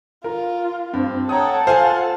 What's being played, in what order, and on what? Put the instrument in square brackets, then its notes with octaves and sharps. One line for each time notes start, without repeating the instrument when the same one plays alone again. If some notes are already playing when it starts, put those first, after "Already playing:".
[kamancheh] F4 [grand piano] A#4
[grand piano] G2 [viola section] C4
[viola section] A4 F#5 A5 [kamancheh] C#5 G5 [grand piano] A#5 D#6
[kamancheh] F4 [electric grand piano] C5 [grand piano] F5 G#5